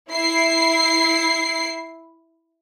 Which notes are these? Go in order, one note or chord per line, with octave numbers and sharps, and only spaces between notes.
E4 C7